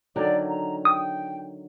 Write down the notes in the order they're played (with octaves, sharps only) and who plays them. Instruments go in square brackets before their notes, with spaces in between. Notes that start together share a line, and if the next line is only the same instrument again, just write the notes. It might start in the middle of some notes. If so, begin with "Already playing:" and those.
[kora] D3 D#3 F#3 [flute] D5
[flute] A#5
[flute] G5 [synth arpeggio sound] D#6